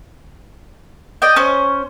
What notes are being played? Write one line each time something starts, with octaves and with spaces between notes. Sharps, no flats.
D5 D#5 G5
C#4 C5